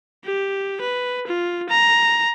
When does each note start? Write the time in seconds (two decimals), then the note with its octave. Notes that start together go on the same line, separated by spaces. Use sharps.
0.24 G4
0.81 B4
1.27 F4
1.69 A#5